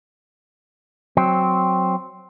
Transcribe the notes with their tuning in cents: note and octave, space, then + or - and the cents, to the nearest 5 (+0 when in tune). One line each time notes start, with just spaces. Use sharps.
F#3 +0 C4 +0